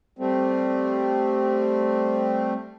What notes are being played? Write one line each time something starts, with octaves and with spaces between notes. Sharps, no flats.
G3 A3 C4